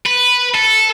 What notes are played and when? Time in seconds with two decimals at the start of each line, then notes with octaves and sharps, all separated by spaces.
0.06 B4
0.55 A4